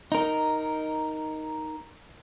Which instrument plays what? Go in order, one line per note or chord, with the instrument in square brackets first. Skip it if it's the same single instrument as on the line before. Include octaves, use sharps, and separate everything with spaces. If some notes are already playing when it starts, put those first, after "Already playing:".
[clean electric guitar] D#4 A#4